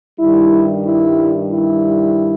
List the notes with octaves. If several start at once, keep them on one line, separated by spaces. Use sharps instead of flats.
G2 D#3 G3 E4
E4
E4